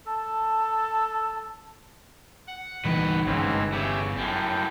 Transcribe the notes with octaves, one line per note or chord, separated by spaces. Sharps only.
A4 A5
F#5
A#2 D#3 E3 G3 B4
G1 C#2 G#2 C#3 E3 C4 C#4
E2 C#3 G4 E5
F#2 A2 G3